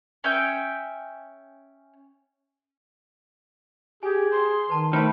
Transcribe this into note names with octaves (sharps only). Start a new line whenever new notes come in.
C#4 E5 G5
G4 G#4 G#5
C6
D#3 B4 A5 A#5
D#3 A3 C5 A5 B5